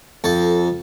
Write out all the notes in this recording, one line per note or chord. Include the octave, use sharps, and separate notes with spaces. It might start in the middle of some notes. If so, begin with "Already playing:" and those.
F2 A4